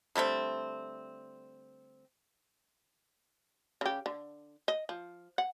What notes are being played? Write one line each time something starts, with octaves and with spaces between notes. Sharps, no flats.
D3 G3 A3 C4
C#3 G4
D3
D#5
F3
F#5